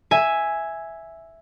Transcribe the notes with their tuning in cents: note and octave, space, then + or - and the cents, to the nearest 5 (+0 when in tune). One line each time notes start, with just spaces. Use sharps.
E5 +0 G#5 +0